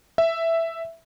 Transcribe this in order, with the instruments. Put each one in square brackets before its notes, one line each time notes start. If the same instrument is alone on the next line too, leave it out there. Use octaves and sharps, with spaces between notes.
[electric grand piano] E5